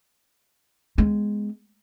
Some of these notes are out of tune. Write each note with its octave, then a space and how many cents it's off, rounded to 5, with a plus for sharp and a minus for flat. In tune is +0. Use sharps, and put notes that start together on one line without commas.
G#3 +0 B3 +15